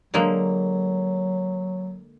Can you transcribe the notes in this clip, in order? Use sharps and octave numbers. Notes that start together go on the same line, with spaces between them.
D3 F#3 G#3 A#3